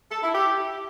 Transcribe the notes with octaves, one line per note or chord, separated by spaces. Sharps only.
A4
E4
G4